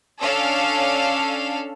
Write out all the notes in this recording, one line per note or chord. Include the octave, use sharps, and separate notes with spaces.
C#4 D4 A4 F5